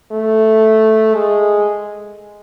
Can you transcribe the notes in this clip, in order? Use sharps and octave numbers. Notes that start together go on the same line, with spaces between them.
A3
G#3